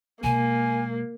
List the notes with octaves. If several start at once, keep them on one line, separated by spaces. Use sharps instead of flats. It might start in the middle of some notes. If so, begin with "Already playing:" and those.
B2 G#3 A#3 G#5